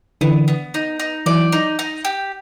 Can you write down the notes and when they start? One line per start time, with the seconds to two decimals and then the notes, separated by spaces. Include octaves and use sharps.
0.21 D3 E3 B3
0.48 B3
0.74 D#4
0.99 D#4
1.26 E3 F#3 D5
1.52 D#4
1.79 D#4
2.05 G4